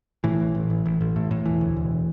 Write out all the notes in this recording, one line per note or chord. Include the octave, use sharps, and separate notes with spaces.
A2 E3
A1
A1
A1
A1
A1
A2
A2
E1 E3
D2
E1